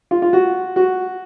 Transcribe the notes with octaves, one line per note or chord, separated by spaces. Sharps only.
F4
F4
F#4
F#4